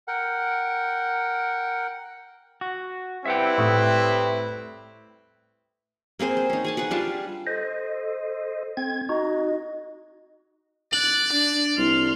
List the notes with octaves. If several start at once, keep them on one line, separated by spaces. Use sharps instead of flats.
A#4 F#5 G5
F#4
G3 C4 E4 B4 E5 F#5 G5
A2 C#6 D#6
A#3 C4 G#4 C5
C5
C#4 D#4
G#4 G#5 A5
G#4 B4 F#5
G3 D4 F4 A5
A4 C5 D#5
C4 G#6
D#4 F#4 D#5
D5 F#6 F#7
D4
C2 C6 F6